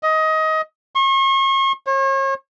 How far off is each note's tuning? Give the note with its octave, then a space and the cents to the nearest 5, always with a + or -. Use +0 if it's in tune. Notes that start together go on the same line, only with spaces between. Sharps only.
D#5 +20
C#6 -40
C#5 -40